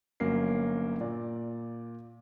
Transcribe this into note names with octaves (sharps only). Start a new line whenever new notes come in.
G1 F#3 A#3 C#4 A#4 C7
A#2 D5